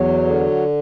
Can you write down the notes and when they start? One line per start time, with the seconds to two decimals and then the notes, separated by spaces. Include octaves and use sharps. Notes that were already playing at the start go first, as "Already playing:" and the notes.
Already playing: E2 F#3
0.25 D3